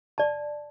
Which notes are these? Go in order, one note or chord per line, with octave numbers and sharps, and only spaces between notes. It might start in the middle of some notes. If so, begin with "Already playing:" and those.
D5 A5